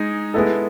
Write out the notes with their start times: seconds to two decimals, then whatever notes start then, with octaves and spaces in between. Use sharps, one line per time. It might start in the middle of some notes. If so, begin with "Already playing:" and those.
Already playing: G#3 D#4 G#4
0.34 G#3 B3 E4 A4